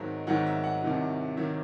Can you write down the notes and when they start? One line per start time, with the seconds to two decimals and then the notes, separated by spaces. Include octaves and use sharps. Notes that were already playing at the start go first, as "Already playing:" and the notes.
Already playing: G#1 G#2 D#3 F#3 E5
0.27 G#1 G#2 D#3 F#3 F#5
0.46 E5
0.64 F#5
0.82 C2 C3 D#3 F#3
1.36 C3 D#3 F#3 E5